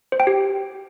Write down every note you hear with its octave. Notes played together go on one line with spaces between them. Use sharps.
C5
G5
G4